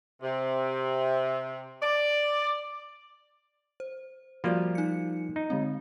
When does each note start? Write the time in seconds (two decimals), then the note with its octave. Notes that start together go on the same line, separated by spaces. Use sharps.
0.22 C3
1.82 D5
3.80 C5
4.44 F3 G3 A#3 F#4 C5 D5
4.75 D#4 C#7
5.36 D#4
5.50 D3 G#3 C4